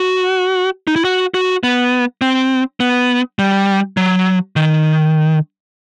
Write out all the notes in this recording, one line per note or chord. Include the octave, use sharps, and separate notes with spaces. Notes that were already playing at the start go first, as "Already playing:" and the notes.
Already playing: F#4
D#4
E4
F#4
F#4
B3
C4
B3
G3
F#3
D#3